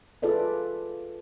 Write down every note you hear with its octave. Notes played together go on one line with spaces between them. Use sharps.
F4 G#4 A4 B4 D5 E5